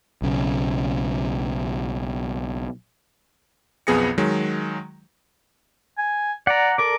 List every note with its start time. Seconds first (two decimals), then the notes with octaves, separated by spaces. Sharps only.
0.22 B1 C#3
3.87 B1 F2 B3 G#4 A#6 C#7
4.18 D#3 F#3 G#3
5.98 G#5
6.47 D5 F#5 A#5
6.78 A4 A#4 D5 D6